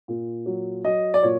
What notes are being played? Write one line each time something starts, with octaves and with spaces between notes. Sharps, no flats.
A#2
F#3
F#3 D#5
D5
A#2 C#5